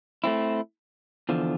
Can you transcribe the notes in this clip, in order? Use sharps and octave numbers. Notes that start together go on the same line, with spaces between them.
A3 C4 E4
E2 D3 F3